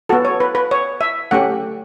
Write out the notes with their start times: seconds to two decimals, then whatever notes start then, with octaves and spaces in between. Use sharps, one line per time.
0.09 B3 F#4 A4
0.25 C#5
0.40 B4
0.55 B4
0.71 C#5
1.01 E5
1.31 A3 C#4 G4 F#5